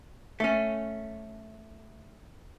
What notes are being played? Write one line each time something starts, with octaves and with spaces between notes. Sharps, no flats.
A3 C#4